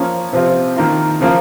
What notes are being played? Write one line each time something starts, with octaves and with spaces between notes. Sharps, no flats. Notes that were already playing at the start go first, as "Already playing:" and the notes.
Already playing: F3 A#3 C#4 F4
C3 F3 C4 F4
D#3 A#3 F4
C#3 F3 A#3 F4